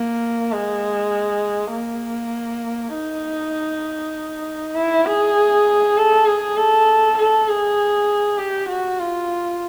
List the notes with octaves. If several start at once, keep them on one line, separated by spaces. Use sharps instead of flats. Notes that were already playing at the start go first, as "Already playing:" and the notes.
Already playing: A#3
G#3
A#3
D#4
E4
G#4
A4
G#4
A4
A4
G#4
G4
F#4
F4